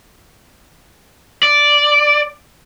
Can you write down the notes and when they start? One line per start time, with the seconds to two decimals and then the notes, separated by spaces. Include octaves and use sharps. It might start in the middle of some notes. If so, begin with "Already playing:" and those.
1.43 D5